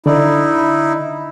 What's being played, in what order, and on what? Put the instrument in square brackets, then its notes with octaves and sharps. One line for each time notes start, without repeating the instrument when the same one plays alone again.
[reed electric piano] D3 D5 [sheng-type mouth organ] D#4 E4